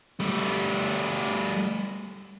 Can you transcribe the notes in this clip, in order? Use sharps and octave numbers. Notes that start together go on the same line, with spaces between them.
G3 A3